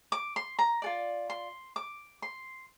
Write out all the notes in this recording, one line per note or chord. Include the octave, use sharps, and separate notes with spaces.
D6
C6
A#5
F4 A4 D5
C6
D6
C6